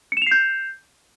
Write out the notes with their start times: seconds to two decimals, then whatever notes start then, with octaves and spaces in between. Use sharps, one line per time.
0.12 C#7
0.17 E7
0.22 F7
0.27 C7
0.31 G6